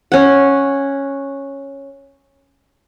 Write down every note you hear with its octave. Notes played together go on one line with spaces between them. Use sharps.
C#4 F#5